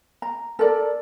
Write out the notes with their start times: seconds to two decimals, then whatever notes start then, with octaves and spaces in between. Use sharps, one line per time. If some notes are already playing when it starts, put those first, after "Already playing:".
0.22 A#5
0.59 A4 A#4 D5